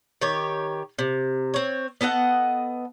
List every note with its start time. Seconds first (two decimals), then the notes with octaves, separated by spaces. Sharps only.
0.21 D#3 G4 C#5
0.99 C3
1.54 C4 C#5
2.01 B3 A4 D#5 F#5